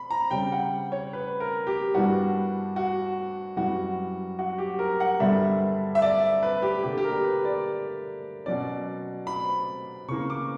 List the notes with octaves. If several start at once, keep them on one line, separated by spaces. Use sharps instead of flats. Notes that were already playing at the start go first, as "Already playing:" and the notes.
Already playing: B5
A#5
C#3 G3 C#4 G5
F#5
C#5
B4
A#4
G4
G2 E3 G3 B3 D4 F#4
F#4
F#2 E3 G3 F#4
F#4
G4
A#4
F#5
G2 D3 G3 B3 E5
E5
D5
B4
G4
D3 A#3 D4 G4
G4
A#4
B4
D5
B2 F#3 C#4 D5
B5
C#3 E3 A#3 C#6
D6